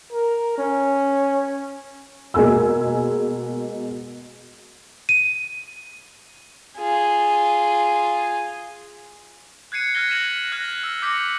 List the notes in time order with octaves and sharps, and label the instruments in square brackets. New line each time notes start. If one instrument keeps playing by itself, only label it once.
[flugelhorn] A#4
C#4
[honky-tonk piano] B2 G#3 A#3 G#5 E6
[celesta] D#7
[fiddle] F4 G#4
[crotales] F#6 G#6 C7 C#7 D#7
F6 F#6 G#6 A#6 G7
A#6 B6 D#7 E7 F#7
F6 F#6 G#6 A#6 F#7
E6
D6 G6 A#6 B6 C#7 F#7